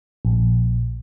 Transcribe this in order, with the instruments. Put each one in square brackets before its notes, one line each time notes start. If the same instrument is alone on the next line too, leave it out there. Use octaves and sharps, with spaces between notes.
[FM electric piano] A#1